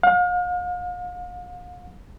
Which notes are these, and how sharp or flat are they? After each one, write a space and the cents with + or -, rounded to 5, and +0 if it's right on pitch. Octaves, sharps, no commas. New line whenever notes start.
F5 +40